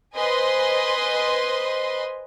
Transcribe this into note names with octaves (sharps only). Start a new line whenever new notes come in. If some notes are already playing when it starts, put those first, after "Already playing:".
B4 C5 D#5 G#5 C6